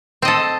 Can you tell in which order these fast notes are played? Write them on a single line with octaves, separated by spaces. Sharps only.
C4 D#5 A4